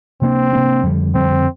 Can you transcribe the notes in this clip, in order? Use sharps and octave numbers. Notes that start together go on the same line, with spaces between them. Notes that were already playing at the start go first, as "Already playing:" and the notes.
C3 A#3 C4 D4
C3 A#3 D4
F2 D3 G3
F2 D3 G3 C4